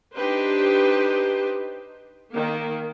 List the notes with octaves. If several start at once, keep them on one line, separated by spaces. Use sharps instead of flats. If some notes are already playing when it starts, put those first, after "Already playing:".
D4 D#4 G4 B4 C5
D#3 A#3